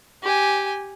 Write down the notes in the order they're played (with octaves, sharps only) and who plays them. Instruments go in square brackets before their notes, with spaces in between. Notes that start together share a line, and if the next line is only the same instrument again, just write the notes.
[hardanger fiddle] G4 G#5